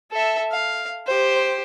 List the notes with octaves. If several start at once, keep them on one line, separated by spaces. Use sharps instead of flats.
A4 E5
F5
G4 C5